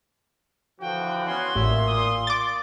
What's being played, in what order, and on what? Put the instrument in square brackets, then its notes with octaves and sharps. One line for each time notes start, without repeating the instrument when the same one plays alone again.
[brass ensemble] D3 E3 F3 [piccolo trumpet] F#4 [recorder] G5
[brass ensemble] B3 C#4 G#5 [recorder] C6
[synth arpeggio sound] A1 [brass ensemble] A#2 [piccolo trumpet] E5
[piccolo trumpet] D#6
[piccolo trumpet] D5 [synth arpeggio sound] D6 A6